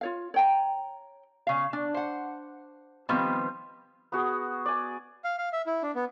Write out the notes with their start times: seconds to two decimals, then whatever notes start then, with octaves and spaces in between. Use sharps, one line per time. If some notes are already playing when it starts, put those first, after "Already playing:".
0.01 F4 C#5 F5
0.34 C#5 G5 A#5
1.47 C#3 F5
1.73 D4
1.94 C5 F#5
3.09 D#3 F3 G3 B3 C4
4.12 B3 F#4 G#4
4.66 D5 G#5
5.24 F5
5.38 F5
5.53 E5
5.66 E4
5.83 D4
5.95 B3